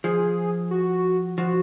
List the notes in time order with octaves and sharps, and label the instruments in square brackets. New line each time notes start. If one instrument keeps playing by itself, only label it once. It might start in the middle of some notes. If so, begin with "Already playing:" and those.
[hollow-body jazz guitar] F3 [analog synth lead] G#4
[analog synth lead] F#4
[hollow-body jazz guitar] F3 [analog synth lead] F#4